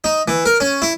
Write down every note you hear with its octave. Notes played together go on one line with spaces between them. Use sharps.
D#4
E3
A#4
C#4
E4